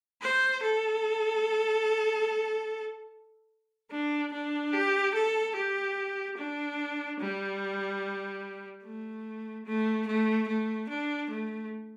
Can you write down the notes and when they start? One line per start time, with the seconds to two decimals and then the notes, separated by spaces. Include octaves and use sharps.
0.21 C5
0.62 A4
3.91 D4
4.33 D4
4.73 G4
5.14 A4
5.55 G4
6.37 D4
7.19 G3
8.84 A3
9.65 A3
10.07 A3
10.48 A3
10.89 D4
11.30 A3